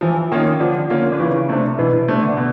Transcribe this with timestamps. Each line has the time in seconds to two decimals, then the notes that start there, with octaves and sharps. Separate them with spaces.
0.01 E3 F3
0.32 D#3 A#3 C#4 F4
0.60 D3 F3
0.90 A#3 C#4 F4
1.12 D3
1.20 C#3 E3
1.49 C3 A3 D4
1.79 B2 E3
1.93 B2
2.08 C3 A3 D4
2.22 D3
2.37 B2